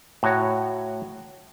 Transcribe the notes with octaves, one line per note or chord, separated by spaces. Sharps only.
A2 F#4 C#5 A#5